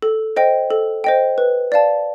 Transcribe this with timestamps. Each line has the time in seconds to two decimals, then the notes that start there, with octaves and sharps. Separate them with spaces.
0.02 A4
0.36 C5 D#5 G5
0.71 A4
1.04 C5 D#5 G5
1.38 B4
1.72 D5 F5 A5